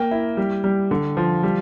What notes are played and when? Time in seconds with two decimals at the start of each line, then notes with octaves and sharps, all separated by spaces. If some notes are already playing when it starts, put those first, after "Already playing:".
Already playing: A#3 G5
0.11 E4
0.37 G3
0.64 G3
0.91 D3
1.17 F3
1.43 G3